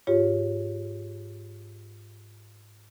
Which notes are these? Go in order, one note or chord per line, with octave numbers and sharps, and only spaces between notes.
G#2 F4 G4 C#5